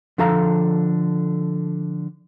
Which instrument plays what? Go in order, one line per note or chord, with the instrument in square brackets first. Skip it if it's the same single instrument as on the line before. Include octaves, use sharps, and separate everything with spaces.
[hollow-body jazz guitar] D3 F3 A4 F5 A#5